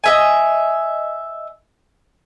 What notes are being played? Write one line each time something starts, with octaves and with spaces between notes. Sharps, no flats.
D#5 E5 G#5